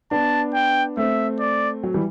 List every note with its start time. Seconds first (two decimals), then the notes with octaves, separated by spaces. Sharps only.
0.11 B3 D4 A5
0.54 G5
0.97 A3 C4 E5
1.40 D5
1.83 F#3
1.94 E3 G3